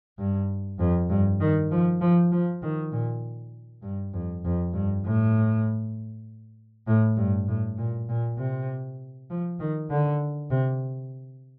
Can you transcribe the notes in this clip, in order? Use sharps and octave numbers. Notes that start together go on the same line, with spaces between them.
G2
F2
G2
D#3
F3
F3
F3
D#3
A#2
G2
F2
F2
G2
A2
A2
G2
A2
A#2
A#2
C3
F3
D#3
D3
C3